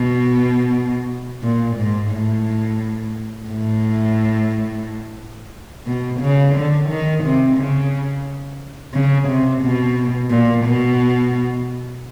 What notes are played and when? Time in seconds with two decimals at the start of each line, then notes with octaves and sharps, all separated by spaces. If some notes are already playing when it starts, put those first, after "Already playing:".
Already playing: B2
1.43 A#2
1.76 G#2
2.11 A2
3.48 A2
5.87 B2
6.21 C#3
6.56 D3
6.89 D#3
7.24 C3
7.57 C#3
8.93 C#3
9.29 C3
9.62 B2
10.30 A#2
10.65 B2